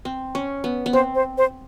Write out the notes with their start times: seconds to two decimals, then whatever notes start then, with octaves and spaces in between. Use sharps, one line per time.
0.05 C4
0.35 C#4
0.64 B3
0.86 B3
0.93 C4 C5
1.15 C5
1.38 C5